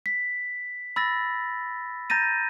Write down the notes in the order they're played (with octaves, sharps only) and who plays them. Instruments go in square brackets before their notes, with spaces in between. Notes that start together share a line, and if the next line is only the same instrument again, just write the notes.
[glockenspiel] B6
B5 E6 A6 A#6
A#5 G6 A6 A#6 D#7